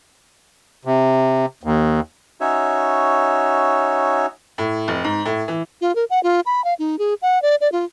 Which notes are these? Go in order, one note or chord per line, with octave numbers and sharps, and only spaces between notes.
C3
D#2
C#4 D#4 F#4 C#5 E5
A2
F1
G#2
A2
E3
F4
A#4
F#5
F4
B5
F5
D#4
G#4
F#5
D5
D5
F4